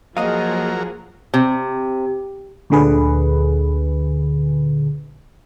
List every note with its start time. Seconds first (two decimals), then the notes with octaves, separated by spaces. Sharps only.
0.17 F3 F#3 A#3 G#4 A#4 D#5 F5
1.34 C3
2.70 D2 A#2 D3 G#4 B4